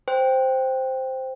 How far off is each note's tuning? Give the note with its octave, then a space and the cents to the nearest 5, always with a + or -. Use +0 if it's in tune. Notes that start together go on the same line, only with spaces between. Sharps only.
C5 +0 G5 +0